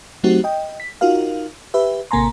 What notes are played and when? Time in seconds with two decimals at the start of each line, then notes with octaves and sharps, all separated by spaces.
0.24 F#3 A3 C4 D#4 F#4 G4
0.44 D#5 G5
0.80 B6
1.01 D#4 F4 F#4 A#4 F5
1.74 G4 B4 E5
2.11 A1 C3 A#3 G#5 A#5 C6